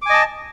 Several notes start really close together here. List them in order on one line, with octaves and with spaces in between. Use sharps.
D6 G#5 D#5 A5